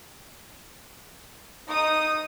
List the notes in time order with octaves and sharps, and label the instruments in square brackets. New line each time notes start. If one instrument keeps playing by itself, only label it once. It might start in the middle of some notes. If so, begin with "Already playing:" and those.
[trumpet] D#4 [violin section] D#6